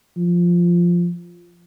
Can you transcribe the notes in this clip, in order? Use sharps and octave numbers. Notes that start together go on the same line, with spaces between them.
F3